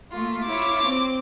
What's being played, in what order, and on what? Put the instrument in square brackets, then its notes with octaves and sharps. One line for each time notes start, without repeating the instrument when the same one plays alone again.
[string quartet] A3 A#3 F4
[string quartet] E4 F4 C#5 [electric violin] D6
[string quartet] C4